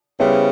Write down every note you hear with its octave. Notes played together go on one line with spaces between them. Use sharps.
C#3 G3 B3 E4 G4 C5